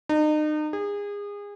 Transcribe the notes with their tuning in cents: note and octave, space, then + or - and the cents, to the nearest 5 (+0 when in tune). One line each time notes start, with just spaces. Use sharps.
D#4 -35
G#4 -30